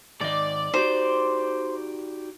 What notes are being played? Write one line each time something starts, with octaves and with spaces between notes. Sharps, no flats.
G#2 D#3 D5 D#5
D#4 F#4 G4 C5